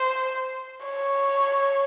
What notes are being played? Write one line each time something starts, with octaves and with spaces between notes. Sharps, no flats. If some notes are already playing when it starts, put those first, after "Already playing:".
Already playing: C5
C#5